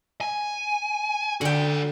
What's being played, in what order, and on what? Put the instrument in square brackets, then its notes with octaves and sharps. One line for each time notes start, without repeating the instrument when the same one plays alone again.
[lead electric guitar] G#5
[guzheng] D3 G5 [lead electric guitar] F#4 D5